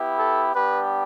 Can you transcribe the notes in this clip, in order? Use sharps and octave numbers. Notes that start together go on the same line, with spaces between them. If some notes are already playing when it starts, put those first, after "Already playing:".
Already playing: B3 E4 G4
A4
G3 B3 D4 G4 B4